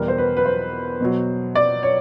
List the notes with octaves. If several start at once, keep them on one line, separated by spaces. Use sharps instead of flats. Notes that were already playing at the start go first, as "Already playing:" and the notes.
Already playing: E2 B2 G3 A#4
C5
B4
B4
C5
B2 F#3
D5
C#5